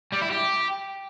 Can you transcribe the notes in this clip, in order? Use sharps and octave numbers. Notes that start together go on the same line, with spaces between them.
G3
E4
G4